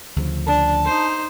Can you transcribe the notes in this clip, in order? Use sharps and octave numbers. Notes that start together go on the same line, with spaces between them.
D2 C#3 F3
D4 A5
D#4 C5